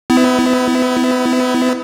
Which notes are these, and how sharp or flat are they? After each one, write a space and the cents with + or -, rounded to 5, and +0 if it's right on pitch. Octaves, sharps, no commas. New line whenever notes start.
B3 +35 E4 -10